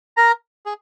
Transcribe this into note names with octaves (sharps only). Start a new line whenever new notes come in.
A#4 A#5
G#4